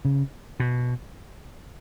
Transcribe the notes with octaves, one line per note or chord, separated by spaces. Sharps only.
C#3
B2